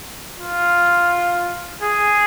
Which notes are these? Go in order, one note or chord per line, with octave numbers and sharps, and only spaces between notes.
F4
G#4